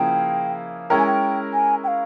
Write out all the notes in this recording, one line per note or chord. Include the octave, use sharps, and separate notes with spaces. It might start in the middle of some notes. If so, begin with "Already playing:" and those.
Already playing: C#3 F3 A#3 E4 G#4 G5
G#3 C#4 E4 A#4 G5
G#5
G5
G#5
G5
F5